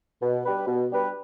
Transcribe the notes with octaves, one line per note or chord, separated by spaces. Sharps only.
B2
G3 D4 G4 B4
B2
G3 D4 G4 B4